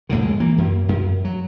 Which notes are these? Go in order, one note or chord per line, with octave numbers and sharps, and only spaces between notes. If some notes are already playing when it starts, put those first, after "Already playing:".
F2 A2 D3 D#3
G#3
E3 A#3
F#2
F#2
F#3